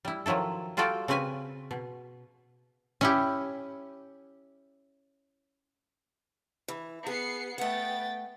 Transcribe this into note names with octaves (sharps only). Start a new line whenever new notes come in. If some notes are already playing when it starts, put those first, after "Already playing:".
G3 E4
D#3 F3 F#3 E4 A4
G3 F4 F#4 A4 D5 G5
C#3 C4 C#4 B4 G#5
B2
C#4 E4 G4
E3
B3 G#4 C7 C#7
A3 B3 F#5 G5 A6